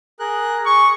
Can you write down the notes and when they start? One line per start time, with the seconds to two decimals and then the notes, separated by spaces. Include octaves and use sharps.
0.19 G#4 A#4 F#6
0.66 G#4 C#6